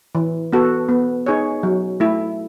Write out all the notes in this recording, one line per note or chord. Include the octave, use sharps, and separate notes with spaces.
E3
B3 F#4 A4
B3
D#4 G#4 C#5
F#3
A3 E4